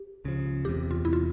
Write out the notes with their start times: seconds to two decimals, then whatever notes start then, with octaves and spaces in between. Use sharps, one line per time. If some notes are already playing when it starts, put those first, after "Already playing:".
Already playing: G4
0.25 C#2 C#3 F3
0.64 E1 E2 C3 G4
0.91 F4
1.04 E1 E2 C3 E4
1.13 F4